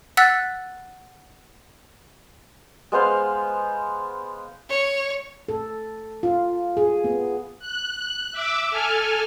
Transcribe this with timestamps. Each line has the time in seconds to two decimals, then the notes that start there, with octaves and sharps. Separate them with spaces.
0.17 F#5 E6 F#6 A6 B6
2.92 G#3 B3 C5 F5
4.69 C#5
5.49 A4
6.23 F4
6.77 G#4
7.04 B3
7.59 F#6
8.32 E5 D6 E6
8.70 A4 G#5 F6